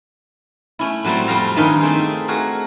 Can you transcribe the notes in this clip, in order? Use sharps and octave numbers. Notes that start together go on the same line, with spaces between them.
A3 C#4 E4
A2 F#3 G3 A3 C4
F2 G3 A3 C5 F5 A#5
G2 D#3 C#4 D#4 F4 E5
A3 C4 G#4
A3 F#4 G#4 A#4